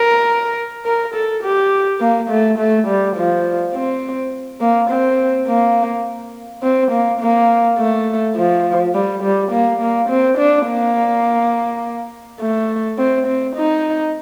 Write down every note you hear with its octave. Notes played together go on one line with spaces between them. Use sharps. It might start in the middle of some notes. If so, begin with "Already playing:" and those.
Already playing: A#4
A#4
A4
G4
A#3
A3
A3
G3
F3
C4
A#3
C4
A#3
C4
A#3
A#3
A3
F3
G3
G3
A#3
A#3
C4
D4
A#3
A3
C4
C4
D#4